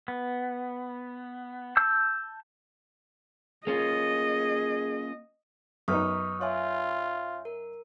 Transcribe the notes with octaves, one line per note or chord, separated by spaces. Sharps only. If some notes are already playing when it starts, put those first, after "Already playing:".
B3
A5 E6 G6
A#3 C#4 F4 G#4 D#5
F#2 B3 D#4 C#6 D#6 F6
F4 C#5 E5 G#5
A#4